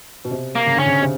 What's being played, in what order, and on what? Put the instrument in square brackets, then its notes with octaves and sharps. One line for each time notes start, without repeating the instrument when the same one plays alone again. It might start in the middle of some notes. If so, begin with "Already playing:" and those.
[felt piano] B2
C3
[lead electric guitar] A#3
[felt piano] C#3
[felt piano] D3 [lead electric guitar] C#4
[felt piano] C#3
C3